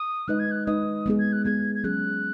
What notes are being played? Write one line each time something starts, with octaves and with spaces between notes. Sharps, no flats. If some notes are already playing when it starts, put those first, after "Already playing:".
Already playing: D#6
G#3 D#4 B4 D#5 F#6
G#6
F#6
G#3 D#4 B4 D#5 D#6
G#3 B3 G#4
G#6
F#6
G#3 B3 G#4 G#6
G#6
F#3 C#4 G#4 F#6